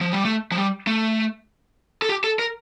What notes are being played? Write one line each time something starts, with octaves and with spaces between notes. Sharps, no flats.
F3
G3
A3
F3
G3
A3
A4
G4
A4
A#4